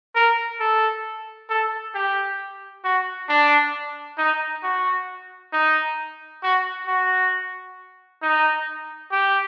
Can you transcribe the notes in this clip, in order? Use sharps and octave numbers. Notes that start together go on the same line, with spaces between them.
A#4
A4
A4
G4
F#4
D4
D#4
F#4
D#4
F#4
F#4
D#4
G4